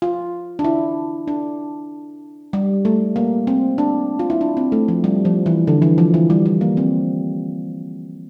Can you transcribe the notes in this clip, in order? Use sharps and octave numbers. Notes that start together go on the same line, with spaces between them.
F4
D4
E4
D4
G3
A3
A#3
C4
D4
F4
E4
D4
C4
A3
F3
G3
F3
E3
D3
E3
F3
E3
G3
G3
A#3
C4